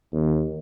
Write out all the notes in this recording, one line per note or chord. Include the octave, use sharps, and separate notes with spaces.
D#2